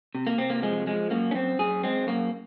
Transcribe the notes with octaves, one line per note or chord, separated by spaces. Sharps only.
C3
A#3
C3 C4
A#3
F3 G#3
F3 G#3
F#2 A#3
C#4
F#2 C4
F#2 G#4
G#3 C4
F#2 A#3